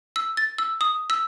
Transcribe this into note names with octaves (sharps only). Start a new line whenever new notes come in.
E6
A6
E6
D#6
E6